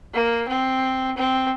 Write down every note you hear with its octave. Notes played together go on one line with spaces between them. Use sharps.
A#3
C4
C4